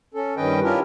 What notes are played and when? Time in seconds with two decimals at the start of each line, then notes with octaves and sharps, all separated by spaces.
0.14 C#4 A4
0.37 G2 D#3 C#4 B4 D#5 G5
0.64 C#4 D4 E4 F4 G4 A#4